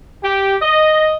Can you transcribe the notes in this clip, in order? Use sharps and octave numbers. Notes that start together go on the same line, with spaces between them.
G4
D#5